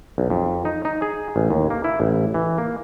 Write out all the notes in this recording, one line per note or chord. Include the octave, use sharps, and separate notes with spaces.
B1
F2
D#4
D#4
G#4
A1
D#2
A#3
E4
A1
E3
A#3